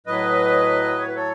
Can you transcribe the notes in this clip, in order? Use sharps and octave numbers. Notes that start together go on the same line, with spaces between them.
A2 F#3 B4 D#5
C#5
B4
A4 C#5